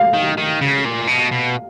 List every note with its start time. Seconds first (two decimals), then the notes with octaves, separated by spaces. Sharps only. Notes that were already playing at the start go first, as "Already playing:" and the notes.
Already playing: F5
0.14 D#3
0.37 D#3
0.61 C#3
0.85 A#2
1.08 B2
1.32 B2